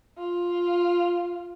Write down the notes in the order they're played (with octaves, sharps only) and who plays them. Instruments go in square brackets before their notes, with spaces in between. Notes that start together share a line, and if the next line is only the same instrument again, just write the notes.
[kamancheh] F4